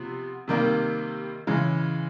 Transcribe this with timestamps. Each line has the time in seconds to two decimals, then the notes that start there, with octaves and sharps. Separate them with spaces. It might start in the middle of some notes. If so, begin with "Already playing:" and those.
Already playing: C3 F3 B3
0.48 C3 D#3 G3 A#3
1.47 C#3 E3 G#3